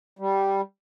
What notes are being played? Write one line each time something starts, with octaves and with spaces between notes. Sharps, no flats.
G3